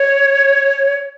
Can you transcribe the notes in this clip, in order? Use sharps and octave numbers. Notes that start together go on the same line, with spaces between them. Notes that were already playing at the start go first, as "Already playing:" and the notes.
Already playing: C#5